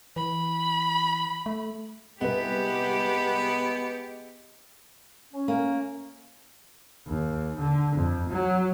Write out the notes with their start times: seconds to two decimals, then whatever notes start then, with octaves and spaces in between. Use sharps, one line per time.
0.16 E3 B5
1.46 A3
2.21 C2 G#3 B3 G4 B4
5.33 C#4
5.48 A#3
7.08 D#2
7.59 D3
7.95 F2
8.29 F#3